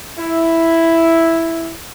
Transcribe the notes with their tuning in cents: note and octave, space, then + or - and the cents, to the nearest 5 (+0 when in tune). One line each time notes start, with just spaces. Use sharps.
E4 +0